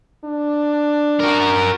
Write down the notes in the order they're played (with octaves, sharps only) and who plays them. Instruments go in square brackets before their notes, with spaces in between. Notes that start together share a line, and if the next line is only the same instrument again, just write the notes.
[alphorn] D4
[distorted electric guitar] F#4 A#4